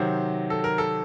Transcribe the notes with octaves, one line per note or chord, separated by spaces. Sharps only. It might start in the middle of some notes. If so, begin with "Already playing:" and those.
Already playing: C3 D#3 F#3 C5
A4
A#4
A4